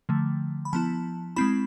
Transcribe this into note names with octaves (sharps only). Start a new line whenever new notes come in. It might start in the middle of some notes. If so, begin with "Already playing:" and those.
D3 F3 A3
B5
F3 B3 E4 A5
G#3 C4 E4 B5